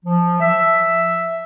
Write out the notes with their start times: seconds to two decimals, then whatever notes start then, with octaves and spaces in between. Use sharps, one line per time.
0.05 F3
0.40 E5